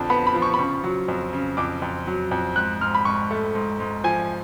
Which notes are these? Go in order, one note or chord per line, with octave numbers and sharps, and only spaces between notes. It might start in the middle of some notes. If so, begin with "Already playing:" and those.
Already playing: F2 D3 F3 A5
B3 B5
B5
F3
C#6
B5
C#3 C#6
F#3
F2
C#3
F2 D6
F2
F#3
F2
G#2 F#6
G#2 F6
B5
G#2 C#6
A3
G#2
G#2
F3 G#5